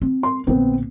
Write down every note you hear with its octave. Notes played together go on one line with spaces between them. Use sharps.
C4
C6
A#1 D3 B3 C4